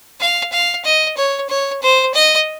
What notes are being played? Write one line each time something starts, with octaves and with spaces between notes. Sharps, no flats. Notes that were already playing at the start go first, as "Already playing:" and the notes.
F5
F5
D#5
C#5
C#5
C5
D#5